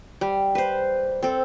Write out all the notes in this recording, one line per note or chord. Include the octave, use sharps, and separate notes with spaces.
G3
B4 C5
C4 A4